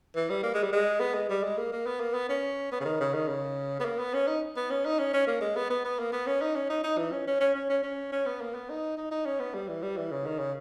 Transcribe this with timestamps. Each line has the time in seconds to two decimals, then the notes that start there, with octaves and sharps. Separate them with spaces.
0.16 E3
0.30 G3
0.43 A#3
0.54 G#3
0.63 G3
0.72 G#3
1.00 B3
1.14 G#3
1.29 G3
1.43 G#3
1.57 A#3
1.72 A#3
1.86 B3
2.01 A#3
2.14 B3
2.29 C#4
2.72 B3
2.81 C#3
2.85 D#3
3.00 C#3
3.14 D#3
3.29 C#3
3.80 B3
3.85 A#3
3.99 B3
4.14 C#4
4.27 D#4
4.56 B3
4.70 C#4
4.86 D#4
4.99 C#4
5.14 C#4
5.27 A#3
5.41 G#3
5.56 B3
5.70 B3
5.85 B3
5.99 A#3
6.13 B3
6.27 C#4
6.41 D#4
6.56 C#4
6.70 D#4
6.84 D#4
6.98 E3
7.12 C#4
7.27 C#4
7.40 C#4
7.55 C#4
7.70 C#4
7.83 C#4
8.12 C#4
8.26 B3
8.41 A#3
8.55 B3
8.70 D#4
8.97 D#4
9.12 D#4
9.26 C#4
9.40 B3
9.54 G3
9.68 E3
9.83 G3
9.97 E3
10.12 C#3
10.26 D#3
10.40 C#3